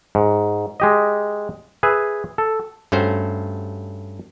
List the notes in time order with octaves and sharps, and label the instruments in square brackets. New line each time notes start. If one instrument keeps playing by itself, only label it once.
[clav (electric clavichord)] G#2
G#3 G4 D#5
G#4 B4 E5
A4
G2 A3 C#4 F#4 C5